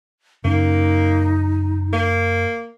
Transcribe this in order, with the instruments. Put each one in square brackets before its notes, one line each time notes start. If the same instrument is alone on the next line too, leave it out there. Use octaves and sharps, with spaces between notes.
[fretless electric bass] F#2 C#3 C#4 [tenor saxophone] A#3 [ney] D#4
[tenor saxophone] A#3